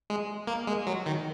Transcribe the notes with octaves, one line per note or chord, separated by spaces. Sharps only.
G#3
A#3
G#3
F#3
D#3